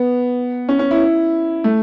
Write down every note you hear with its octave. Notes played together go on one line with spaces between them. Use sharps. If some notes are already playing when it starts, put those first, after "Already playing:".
Already playing: B3
C#4
C#4
E4
A3